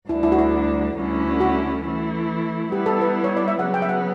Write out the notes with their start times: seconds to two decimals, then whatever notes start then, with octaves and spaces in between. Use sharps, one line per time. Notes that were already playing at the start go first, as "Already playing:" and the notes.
0.09 D2 D3 G3 D4 E4
0.23 E4
0.32 F#4
0.39 E4
0.97 D2 D3 G3 C#4 E4
1.40 F#4
1.84 E3 A3 E4
2.71 G3 B3 E4 G4
2.86 A4
3.01 B4
3.24 C#5
3.37 D5
3.48 E5
3.59 C#3 F#3 B3 F#5
3.74 G5
3.82 E5
3.89 F#5